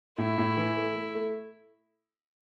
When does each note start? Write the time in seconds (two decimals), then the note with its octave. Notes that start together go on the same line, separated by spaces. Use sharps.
0.18 A2 E4
0.38 A2
0.57 E3
0.77 A3
0.96 A3
1.15 A3